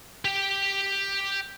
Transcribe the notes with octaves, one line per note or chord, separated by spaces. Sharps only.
G4 G5